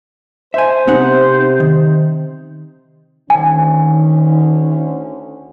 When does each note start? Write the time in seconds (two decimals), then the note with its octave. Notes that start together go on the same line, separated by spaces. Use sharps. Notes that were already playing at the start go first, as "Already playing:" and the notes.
0.54 C5 E5 G#5
0.87 C3 B3 D#4 F#5
1.60 D#3
3.30 D2 D#3 C#4 G#5